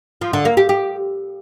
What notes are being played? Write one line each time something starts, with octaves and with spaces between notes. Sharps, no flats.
F3
D3
A#3
G4
G4